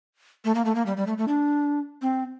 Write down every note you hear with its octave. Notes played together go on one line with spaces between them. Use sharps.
A3
A#3
A3
A#3
G3
G3
A3
A3
D4
C4